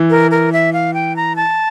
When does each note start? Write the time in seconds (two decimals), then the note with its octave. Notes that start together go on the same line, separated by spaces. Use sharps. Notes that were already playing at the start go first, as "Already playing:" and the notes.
Already playing: E3
0.10 A#4
0.31 A#4
0.53 E5
0.73 F5
0.94 G5
1.16 A#5
1.36 A5